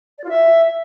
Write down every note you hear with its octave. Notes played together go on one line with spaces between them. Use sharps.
D5
F4
E5